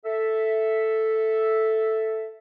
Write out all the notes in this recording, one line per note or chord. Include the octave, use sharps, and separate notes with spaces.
A4 E5